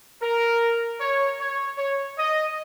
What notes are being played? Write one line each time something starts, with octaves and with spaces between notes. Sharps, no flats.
A#4
C#5
C#5
C#5
D#5